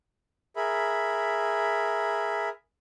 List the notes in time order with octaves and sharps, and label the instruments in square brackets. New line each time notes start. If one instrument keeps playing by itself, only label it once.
[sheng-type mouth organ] G#4 A#4 E5 B5